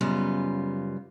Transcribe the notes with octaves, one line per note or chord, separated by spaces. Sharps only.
F#2 C#3 G3 B3 D#4 F4